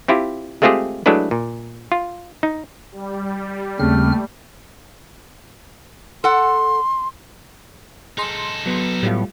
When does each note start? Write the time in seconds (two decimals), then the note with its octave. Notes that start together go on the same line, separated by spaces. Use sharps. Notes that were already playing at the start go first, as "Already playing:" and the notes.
0.08 C4 E4 F4 G4
0.62 G#3 A3 C4 F4 G4 G#4
1.06 F#3 G#3 A3 D4 E4 B4
1.31 A#2
1.92 F4
2.43 D#4
2.92 G3
3.80 D#2 C#3 A3 C4 F6
6.24 A4 F#5 C6
8.18 D#4 G#4 A4 C6
8.66 F#3 B3
9.03 A2 G3 A3 F4